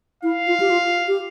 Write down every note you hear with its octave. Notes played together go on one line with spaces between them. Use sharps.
E4 F5
F4
G4
F4
G4